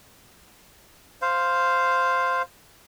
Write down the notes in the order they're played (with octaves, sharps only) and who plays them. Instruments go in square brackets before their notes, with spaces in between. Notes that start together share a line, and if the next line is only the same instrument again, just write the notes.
[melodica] C5 F5